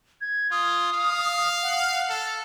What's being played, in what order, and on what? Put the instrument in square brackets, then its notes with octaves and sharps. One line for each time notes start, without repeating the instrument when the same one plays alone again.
[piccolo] G#6
[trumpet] F4 [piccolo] D#6
[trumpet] F5
[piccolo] F#5
[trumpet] A4